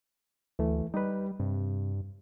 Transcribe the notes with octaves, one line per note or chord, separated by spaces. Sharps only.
D2 E3 A3
G3 D#4 B4
G2 C3